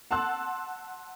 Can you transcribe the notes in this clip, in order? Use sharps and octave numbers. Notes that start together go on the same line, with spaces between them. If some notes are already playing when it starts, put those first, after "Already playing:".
F#5 A5 C6 E6 F#6